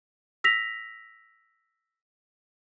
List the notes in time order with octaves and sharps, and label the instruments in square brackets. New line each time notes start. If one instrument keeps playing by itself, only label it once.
[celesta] E6 A#6 B6 F7